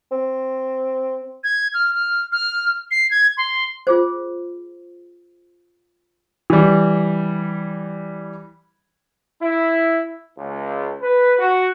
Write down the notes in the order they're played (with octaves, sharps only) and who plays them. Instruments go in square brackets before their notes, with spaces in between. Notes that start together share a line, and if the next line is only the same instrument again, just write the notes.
[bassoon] C4
[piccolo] G#6
F6
F6
F6
C7
G#6
C6
[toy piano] F4 G#4 C5
[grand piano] E3 G3
[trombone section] E4
C#2
B4
F#4